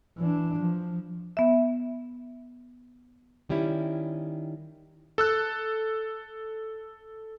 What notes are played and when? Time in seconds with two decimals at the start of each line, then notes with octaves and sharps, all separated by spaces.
0.18 E3 D4
0.60 F3
1.37 B3 E5
3.49 D#3 G3 C#4 E4
5.18 A4 E6 F#6